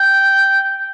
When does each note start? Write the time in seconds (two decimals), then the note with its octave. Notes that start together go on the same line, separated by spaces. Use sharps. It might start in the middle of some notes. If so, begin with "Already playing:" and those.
Already playing: G5